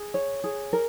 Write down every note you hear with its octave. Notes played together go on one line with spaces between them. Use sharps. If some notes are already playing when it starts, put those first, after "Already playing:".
Already playing: G#4
C#5
G#4
A#4